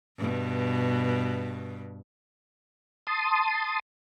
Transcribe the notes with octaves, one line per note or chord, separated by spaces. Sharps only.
G2 B2
A5 C6 D#6